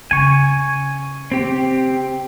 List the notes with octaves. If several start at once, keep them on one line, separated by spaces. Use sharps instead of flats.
C#3 G#5 C#6
C4 G4